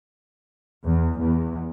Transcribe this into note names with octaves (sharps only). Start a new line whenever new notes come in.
E2
E2